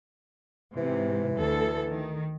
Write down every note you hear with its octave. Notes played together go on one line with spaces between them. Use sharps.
G#2 C3 E3
D2 A4
D#3